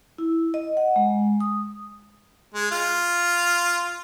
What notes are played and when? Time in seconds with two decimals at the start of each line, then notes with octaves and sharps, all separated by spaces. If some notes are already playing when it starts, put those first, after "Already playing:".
0.18 E4
0.54 D#5
0.77 F#5
0.96 G#3
1.40 D#6
2.54 G#3
2.71 F4